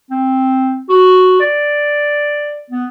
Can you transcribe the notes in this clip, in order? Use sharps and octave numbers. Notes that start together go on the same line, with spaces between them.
C4
F#4
D5
B3